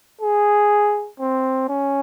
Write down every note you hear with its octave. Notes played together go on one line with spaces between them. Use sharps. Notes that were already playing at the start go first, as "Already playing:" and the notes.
G#4
C4
C#4